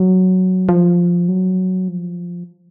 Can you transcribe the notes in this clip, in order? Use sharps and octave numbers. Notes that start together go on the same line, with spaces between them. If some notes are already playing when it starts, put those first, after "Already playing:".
Already playing: F#3
F3
F#3
F3